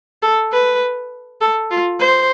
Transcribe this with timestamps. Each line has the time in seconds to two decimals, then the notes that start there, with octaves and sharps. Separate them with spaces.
0.22 A4
0.52 B4
1.41 A4
1.71 F4
2.00 C5